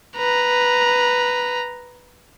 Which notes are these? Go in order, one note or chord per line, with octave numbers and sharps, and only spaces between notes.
B4 A#5